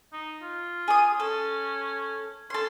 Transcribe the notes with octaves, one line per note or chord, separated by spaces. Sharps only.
D#4
F4
G#4 D#6
C#4 A4
C#4 A4 C6